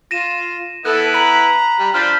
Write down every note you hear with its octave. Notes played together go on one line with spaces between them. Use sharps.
F4 A#6 D#7 E7
B3 E4 A4 F#6
A#5 B5 B6 F#7
G3
D4 F4 C5 F6 G6 B6